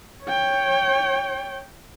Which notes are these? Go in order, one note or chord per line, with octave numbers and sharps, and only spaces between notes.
C#5 G5